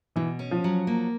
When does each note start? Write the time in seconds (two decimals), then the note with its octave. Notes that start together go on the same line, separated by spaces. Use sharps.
0.16 B2 E3
0.39 C#4
0.51 F3
0.64 F#3
0.87 A#3